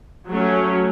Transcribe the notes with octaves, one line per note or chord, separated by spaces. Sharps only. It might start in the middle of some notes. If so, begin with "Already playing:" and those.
F#3 A3 C#4